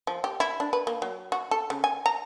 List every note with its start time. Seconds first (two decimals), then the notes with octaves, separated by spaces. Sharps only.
0.07 F3
0.24 G4
0.40 E4
0.60 D4
0.73 B4
0.87 A#3
1.02 F#3
1.32 F#4
1.51 A4
1.70 C#3
1.84 G#5
2.06 A#5